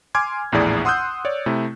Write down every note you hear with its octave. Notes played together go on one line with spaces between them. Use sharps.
G#5 C6 D6 F6 G#6
A#1 E2 A2 E4 G#4 D5
F#5 C6 D#6 E6 F#6 G6
C#5 D5
C3 A3 E4